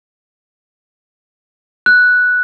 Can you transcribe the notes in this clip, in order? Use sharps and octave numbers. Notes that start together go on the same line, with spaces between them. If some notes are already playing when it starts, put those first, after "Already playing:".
F#6